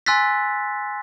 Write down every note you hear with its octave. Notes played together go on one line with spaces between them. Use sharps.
G#5 C6 E6 F#6 A6 B6